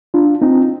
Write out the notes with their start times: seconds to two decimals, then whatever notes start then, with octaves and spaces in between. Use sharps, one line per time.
0.14 D4 F4
0.42 C4 D#4